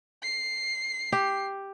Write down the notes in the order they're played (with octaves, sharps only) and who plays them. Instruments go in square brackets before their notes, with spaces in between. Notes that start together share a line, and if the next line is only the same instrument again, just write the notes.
[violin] C7
[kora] G4